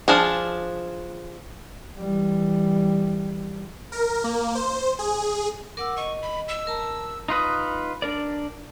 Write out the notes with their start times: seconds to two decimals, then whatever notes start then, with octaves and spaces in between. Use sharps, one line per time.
0.08 F3 D4 G#4
1.97 E3 G3
3.92 A#4
4.24 A#3
4.55 C5
4.99 G#4
5.77 A#4 F#5 D6 E6
5.97 D#5 C#6
6.22 B5
6.49 E6
6.67 A#4 A5 A#5
7.28 D#4 F4 B4 D#6
8.02 D4 A#4 D5